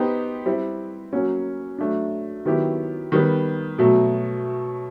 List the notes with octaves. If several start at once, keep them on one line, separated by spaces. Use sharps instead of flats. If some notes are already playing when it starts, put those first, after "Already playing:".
Already playing: B3 D#4 G4 C5
G3 C4 E4
F#3 A#3 C#4 F#4
F#3 A3 D4
D#3 F#3 B3 E4 G4
D#3 G3 B3
B2 F#3 A3